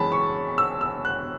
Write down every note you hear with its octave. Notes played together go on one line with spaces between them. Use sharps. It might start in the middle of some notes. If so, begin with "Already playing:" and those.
Already playing: F#2 E3 G#3 A5 B5
C#6
E6
E6
F#6